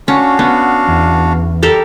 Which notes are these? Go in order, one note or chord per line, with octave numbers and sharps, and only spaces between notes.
C#4 D4 F#4 F5
B3
E2
G3 G4 A4 A#4